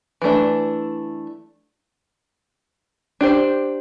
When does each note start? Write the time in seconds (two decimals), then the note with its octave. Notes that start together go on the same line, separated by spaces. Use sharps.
0.22 E3 A3 D4
3.21 D4 G4 C5